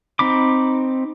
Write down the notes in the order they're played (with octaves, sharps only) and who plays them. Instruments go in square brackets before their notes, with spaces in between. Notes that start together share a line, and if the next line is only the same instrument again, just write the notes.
[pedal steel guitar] C4 D#4 B5 D6